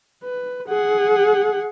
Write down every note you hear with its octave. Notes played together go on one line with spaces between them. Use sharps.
B4
G#4 F#5